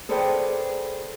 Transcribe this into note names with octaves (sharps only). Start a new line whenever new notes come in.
G#4 A4 B4 C5 D5 G5